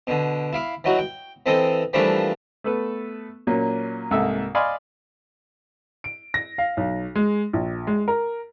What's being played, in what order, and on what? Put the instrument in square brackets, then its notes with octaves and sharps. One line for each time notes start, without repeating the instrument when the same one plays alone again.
[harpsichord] B2 D3
E4 F5 D6
E3 F#3 D#4 F#4
G5
E3 C4 A4 D#5
E3 F3 G3 A3 A#3 D4
[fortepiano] A3 B3 A4 B4
A#2 F#3 A#3 C#4
C2 G#2 A#3 A4 E5
D5 D#5 F5 G#5 B5 C6
[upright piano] D7
A#6
F5
B1
G#3
A#1
G#3
A#4